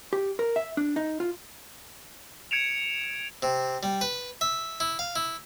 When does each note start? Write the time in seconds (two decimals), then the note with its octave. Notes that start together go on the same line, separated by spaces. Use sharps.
0.13 G4
0.39 A#4
0.56 E5
0.77 D4
0.96 D#4
1.20 F4
2.51 G#6 C#7 D7 E7 F7
3.43 C3
3.83 G3
4.01 B4
4.41 E5
4.80 E4
4.99 F5
5.16 E4